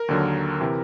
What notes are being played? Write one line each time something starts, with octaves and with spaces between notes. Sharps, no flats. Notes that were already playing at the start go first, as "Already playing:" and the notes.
Already playing: A#4
D#2 D3 F#3
C3 E3